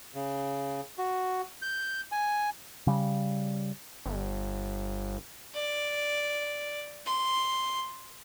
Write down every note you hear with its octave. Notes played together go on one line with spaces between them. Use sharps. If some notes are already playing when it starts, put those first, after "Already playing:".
C#3
F#4
G6
G#5
C#3 G3
G1
D5
C6